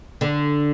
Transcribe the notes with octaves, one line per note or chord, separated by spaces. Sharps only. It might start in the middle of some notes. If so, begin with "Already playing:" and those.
D3